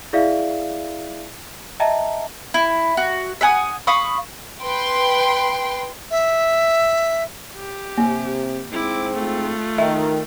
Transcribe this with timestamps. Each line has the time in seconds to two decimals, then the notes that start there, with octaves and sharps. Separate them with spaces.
0.13 E4 G#4 D5 E5 F5
1.80 D#5 E5 G5 A5 A#5
2.54 E4
2.97 F#4
3.41 E5 F#5 G#5 D#6
3.87 F5 B5 C#6 D#6
4.62 B4 G5 C6
6.11 E5
7.57 G4
7.98 C3 A#3
8.72 G#2 C4 E4 D6
9.15 A3 F4
9.78 D#3 E5